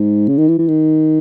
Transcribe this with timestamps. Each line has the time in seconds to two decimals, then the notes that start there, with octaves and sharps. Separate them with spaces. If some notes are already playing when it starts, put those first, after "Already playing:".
Already playing: G#2
0.28 C#3
0.38 D#3
0.48 E3
0.59 E3
0.68 D#3